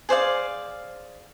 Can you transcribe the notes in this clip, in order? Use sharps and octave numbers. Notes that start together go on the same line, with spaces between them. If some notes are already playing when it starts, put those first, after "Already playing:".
G#4 C5 D5 F5